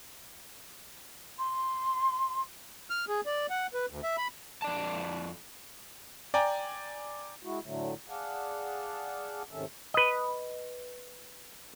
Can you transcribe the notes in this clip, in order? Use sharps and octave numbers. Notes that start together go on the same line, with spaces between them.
C6
F6
G#4
D5
F#5
B4
D2
E5
B5
F2 D5 A5
D5 G5 G#5 A#5
G#3 E4 F#4
A2 D3 F#3 A3
G#4 D5 F5 F#5 A5
G#2 C3 D#3 C#4 A4 E5
B4 D#5